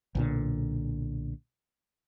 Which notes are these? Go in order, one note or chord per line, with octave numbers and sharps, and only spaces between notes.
B1 A#2 D3